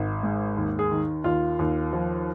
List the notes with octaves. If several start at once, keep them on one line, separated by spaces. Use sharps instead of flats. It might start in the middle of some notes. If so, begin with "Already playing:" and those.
Already playing: G#1
G#2
D#2
G#4
D#3
D#2 F4
D#2
F3